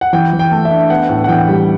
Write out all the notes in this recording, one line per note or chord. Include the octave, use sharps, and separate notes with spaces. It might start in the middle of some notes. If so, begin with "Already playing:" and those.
F#5
E3 G5
E3
G5
A3
E5
D4
B3 F#5
A2
F#5
E3 G5
G3